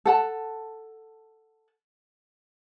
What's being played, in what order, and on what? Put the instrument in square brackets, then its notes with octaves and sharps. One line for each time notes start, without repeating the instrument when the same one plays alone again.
[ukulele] A4 F#5 A5